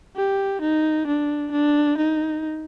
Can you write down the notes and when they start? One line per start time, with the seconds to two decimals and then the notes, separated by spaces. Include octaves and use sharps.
0.16 G4
0.62 D#4
1.07 D4
1.52 D4
1.98 D#4